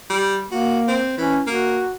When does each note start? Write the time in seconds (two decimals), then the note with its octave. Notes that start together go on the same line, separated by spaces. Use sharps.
0.10 G3
0.51 A#3 F#4
0.88 C4
1.18 E3 C#4
1.47 A#3 F#4